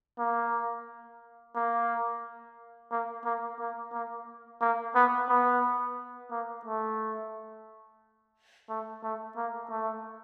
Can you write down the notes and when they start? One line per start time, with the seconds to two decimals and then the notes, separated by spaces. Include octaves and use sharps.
0.19 A#3
1.55 A#3
2.91 A#3
3.25 A#3
3.60 A#3
3.93 A#3
4.61 A#3
4.95 B3
5.29 B3
6.31 A#3
6.65 A3
8.69 A3
9.03 A3
9.37 A#3
9.71 A3